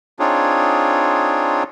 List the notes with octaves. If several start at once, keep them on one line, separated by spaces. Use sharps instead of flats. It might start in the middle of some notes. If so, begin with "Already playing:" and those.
C4 D4 D#4 F4 G#4 C#5